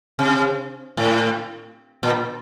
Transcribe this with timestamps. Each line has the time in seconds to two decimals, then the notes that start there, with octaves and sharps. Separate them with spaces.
0.19 C3
0.97 A2
2.03 A#2